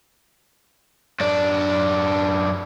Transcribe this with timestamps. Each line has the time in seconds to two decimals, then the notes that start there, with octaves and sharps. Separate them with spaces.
1.20 F#2 D4